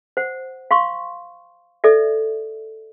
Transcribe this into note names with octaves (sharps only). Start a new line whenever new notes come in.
C5 F#5
F5 C6 C#6
A4 D5 E5